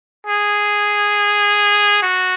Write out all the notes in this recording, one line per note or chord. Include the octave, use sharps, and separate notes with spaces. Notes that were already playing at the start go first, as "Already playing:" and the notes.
G#4
F#4